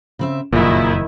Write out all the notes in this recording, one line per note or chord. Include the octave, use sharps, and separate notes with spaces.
C#3 C4 E5
F#1 F2 A#2 D#3 E4